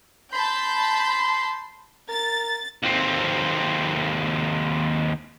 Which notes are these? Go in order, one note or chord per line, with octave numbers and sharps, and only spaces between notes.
A5 B5 C6 G6
A#4 A6
D#2 C4